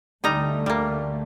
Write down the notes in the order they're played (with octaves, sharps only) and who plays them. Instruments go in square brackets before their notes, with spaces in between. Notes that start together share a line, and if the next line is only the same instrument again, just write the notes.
[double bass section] D2 D3 A3 [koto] G3 D#4 A#5
[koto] G3 A#3